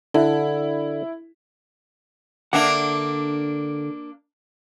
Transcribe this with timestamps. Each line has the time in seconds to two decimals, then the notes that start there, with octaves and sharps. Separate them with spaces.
0.14 D3 E4
2.53 D3 A#3 D4 E5 F#5